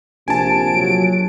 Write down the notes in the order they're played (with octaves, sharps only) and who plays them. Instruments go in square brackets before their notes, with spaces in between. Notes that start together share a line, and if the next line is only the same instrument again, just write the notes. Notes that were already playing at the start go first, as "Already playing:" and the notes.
[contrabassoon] A#1 [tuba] C3 [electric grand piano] G#5 A5 [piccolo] D7
[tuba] F#3